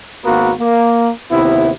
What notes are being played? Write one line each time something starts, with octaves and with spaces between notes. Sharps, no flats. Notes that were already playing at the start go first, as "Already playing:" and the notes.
G#1 A#3 B3 F#4 A#4
A#3
D#2 C3 B3 E4